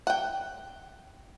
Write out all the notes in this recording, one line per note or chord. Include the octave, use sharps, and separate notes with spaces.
F#5 G5